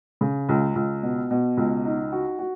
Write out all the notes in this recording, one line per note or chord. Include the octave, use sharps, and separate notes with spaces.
C#3
C#2
C#2
B2
B2
C#2
D#4
F#4
F#4